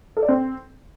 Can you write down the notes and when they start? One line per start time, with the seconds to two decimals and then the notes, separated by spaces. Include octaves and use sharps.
0.17 A4
0.23 D5
0.28 C4